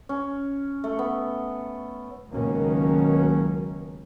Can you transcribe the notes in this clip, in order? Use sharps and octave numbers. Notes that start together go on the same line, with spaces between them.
C#4
A3
B3
C#2 B2 D#3 F#3 A#3 C#4